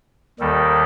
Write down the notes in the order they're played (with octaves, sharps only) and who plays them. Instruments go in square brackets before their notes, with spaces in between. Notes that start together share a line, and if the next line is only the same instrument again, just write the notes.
[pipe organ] D#2 D#3 G3 A4